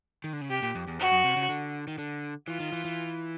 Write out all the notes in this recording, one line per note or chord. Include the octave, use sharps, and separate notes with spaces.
D#3
D3
C#3
C3 G4
A#2
F2
E2
F2 F#4
F#2
C3
C#3
D3
D#3
D3
E3 F4
D#3
E3
E3